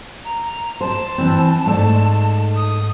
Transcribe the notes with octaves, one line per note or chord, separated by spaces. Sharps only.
A#5
C5 A5
E3 C4
G#2 A3 D5
D#6